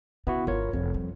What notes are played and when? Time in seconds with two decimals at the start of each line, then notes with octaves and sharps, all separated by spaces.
0.27 C#3 B3 E4 F#4
0.47 G1 F4 A#4 C#5
0.73 F1 F2 E3
0.94 G3